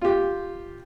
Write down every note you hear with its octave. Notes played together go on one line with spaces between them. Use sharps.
F4 G4